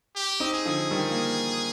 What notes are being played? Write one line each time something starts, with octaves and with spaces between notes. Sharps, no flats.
G4
C4 D#4
G#4
D3 F3
D#3 G3
A#3